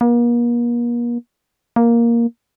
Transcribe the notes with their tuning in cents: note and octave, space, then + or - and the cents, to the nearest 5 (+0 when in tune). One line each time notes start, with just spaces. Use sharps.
A#3 +40
A#3 +5